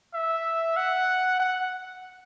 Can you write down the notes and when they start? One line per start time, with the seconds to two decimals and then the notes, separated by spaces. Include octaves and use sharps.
0.14 E5
0.77 F#5
1.40 F#5